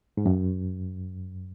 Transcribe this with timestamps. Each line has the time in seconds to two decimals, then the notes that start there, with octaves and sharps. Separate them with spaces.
0.17 G#2
0.26 F#2